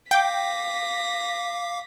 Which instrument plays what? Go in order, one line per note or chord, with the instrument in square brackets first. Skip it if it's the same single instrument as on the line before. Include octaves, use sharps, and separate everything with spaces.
[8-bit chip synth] F5 D6 [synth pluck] G5 [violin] A#6 B6